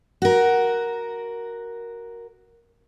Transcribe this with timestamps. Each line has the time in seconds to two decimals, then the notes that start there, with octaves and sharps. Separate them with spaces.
0.22 F#4 A#4